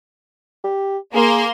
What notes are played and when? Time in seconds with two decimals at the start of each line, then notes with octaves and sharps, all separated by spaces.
0.64 G4
1.14 A#3 G#4 C6